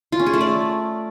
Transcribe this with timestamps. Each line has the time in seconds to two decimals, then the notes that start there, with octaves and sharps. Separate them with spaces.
0.12 F4
0.19 C#4
0.26 G#4
0.34 A3
0.41 D5